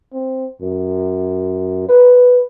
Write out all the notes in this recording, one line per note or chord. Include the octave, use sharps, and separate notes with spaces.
C4
F#2
B4